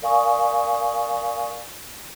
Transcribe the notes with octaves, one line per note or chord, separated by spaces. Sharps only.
A#4 D5 F5 G#5 C#6 D#6